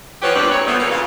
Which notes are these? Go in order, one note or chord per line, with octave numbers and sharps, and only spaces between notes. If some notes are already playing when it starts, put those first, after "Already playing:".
E3 F3 B3 G4 B4 C#5
E2 G2 A#2 C4 B4 D5
A#2 C#5
A#2 F3 G3 A3 B3
E3 A#3 E4 C#5
A#2 C#3 E3 F4